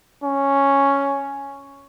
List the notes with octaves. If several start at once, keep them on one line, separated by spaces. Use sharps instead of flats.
C#4